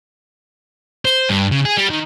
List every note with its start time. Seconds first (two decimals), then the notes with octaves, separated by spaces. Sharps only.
1.05 C5
1.29 G2
1.51 C#3
1.65 G#4
1.78 G3
1.90 D#3